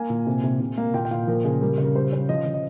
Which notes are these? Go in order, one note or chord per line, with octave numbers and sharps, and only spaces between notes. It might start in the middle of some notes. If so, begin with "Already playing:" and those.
Already playing: A#3 G#5
A#2
C3
C3
C3
A#3
A#2 G5
G5
A#2 F5
F3 A#4
C#3 G#4
G3 A#4
C#3
A#4
G3 C5
C#4
F3 D#5
F3
D#5